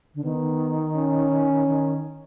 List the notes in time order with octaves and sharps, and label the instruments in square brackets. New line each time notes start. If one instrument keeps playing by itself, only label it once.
[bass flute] D3
[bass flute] D#3 [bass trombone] B3
[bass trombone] C#4
[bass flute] D#3